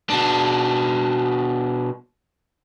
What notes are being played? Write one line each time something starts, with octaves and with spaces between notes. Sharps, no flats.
B2 D4